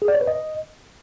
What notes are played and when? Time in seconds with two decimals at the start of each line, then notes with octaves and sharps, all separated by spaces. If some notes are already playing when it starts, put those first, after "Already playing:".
0.02 G#4
0.08 D5
0.15 C#5
0.21 B4
0.28 D#5